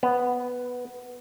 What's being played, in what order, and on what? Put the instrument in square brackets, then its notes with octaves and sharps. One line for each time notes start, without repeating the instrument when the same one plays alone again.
[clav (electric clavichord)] B3